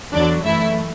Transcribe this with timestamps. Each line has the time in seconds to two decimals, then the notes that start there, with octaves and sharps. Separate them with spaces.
0.12 E2 D3 F#3 D4 D5
0.44 F#2 E3 A3 E4 E5